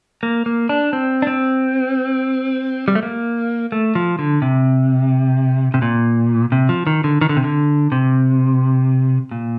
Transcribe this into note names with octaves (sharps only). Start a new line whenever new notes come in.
A#3
A#3
D4
C4
D4
C4
G3
A3
A#3
A3
F3
D3
C3
C3
A#2
C3
F3
D#3
D3
D#3
D3
C3
D3
C3
A#2